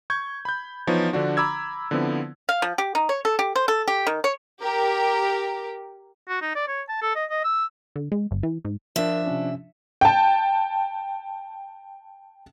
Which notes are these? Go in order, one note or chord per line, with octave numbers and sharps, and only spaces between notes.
C#6 G6 G#6
B5 G6
E3 F3 B3 D#4 C#5
D3 F3 D4 F#4
A#5 B5 D6 E6 G#6
D3 F3 B3 C4 E4
F5
F3
G4
D#4
C#5
A4
G4
C5
A4
G4
D#3
C#5
G4 A#4
F#4
D#4
D5
C#5
A5
A4
D#5
D#5
E6
D3
G#3
G1
E3
G#2
F3 D4 F4 A#4 E5
C3 C#4
G5 A5